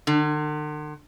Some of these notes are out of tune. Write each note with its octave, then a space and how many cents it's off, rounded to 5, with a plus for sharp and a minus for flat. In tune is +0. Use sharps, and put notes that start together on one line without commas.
D3 +45